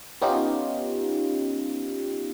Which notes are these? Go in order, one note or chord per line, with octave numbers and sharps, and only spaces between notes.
B3 C#4 D#4 F4 G4